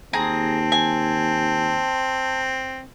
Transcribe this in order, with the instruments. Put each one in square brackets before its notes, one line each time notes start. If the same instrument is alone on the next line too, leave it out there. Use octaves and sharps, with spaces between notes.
[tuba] D#2 [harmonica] C4 [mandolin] G#4 A#5 [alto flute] A5
[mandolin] G#5